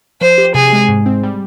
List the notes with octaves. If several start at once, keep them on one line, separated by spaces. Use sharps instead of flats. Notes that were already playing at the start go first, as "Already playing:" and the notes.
F3 C5
G4
C3 G#4
G#3
G#2
C4
G3